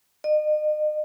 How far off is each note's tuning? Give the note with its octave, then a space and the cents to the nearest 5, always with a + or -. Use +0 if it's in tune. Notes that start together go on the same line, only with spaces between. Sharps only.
D#5 -40